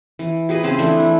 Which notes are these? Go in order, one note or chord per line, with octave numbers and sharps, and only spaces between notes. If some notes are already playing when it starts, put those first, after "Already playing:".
E3
G4 G#4 B4 D#5
C#3 C4 G#4 A5
E3 A3 D4 A4
E4